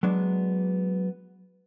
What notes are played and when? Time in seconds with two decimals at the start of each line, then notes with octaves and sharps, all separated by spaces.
0.03 F#3 G#3 B3 D4